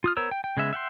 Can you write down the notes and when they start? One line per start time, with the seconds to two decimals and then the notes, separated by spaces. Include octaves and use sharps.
0.04 F4 D#6 F6
0.17 B3 A#4 C5 C#5 E6
0.31 G5
0.44 G5
0.57 C#3 G#3 B3 E5
0.73 E5 F#5 G5 C6